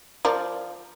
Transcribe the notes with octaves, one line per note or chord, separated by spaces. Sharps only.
F3 A#4 D5